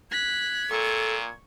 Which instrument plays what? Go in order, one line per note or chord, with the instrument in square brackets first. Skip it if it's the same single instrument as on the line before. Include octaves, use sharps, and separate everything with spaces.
[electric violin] F#6 B6 [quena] G#6
[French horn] A#2 [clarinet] A4 [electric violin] C#6